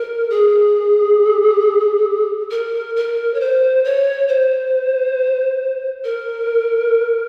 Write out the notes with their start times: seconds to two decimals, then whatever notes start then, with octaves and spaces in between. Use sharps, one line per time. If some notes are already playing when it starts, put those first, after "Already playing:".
Already playing: A#4
0.30 G#4
2.51 A#4
2.96 A#4
3.34 C#5
3.40 C5
3.84 C#5
4.28 C5
6.04 A#4